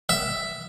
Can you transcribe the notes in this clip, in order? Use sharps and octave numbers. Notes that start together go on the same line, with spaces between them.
E5